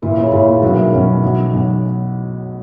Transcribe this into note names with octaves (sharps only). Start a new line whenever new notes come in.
A#2 E3 A#3 E4
C#3
A#2 C#3 A#3 E4
D#3
B1 B2 E3 F#3 A#3 C#4
B1 B2 F#3 A#3 C#4
B1 B2 F#3
B1 B2 F#3